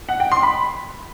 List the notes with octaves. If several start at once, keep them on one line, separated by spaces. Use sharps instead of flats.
F#5
G5
C6
B5